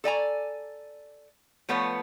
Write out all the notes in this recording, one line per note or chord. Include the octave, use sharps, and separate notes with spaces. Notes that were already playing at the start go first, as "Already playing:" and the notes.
A4 D5 G#5 A#5
F3 A3 B3 B4 C#5